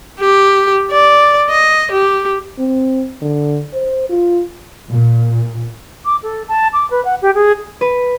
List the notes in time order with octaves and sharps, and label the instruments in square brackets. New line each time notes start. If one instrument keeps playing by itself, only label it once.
[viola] G4
D5
D#5
G4
[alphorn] C4
D3
C5
F4
[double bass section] A#2
[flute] D6
A4
A5
D6
B4
F#5
G4
G#4
[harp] B4